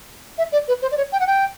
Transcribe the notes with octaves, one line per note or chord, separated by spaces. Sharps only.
E5
D5
B4
C5
D5
C#5
G5
F#5
G5